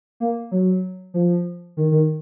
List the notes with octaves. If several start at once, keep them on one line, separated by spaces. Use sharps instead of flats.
A#3
F#3
F3
D#3
D#3